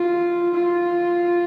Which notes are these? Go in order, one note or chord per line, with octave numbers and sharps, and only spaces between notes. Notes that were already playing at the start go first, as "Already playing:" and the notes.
Already playing: F4
F4